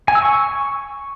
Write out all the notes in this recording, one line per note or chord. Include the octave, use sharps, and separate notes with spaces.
G#5
E6
C#6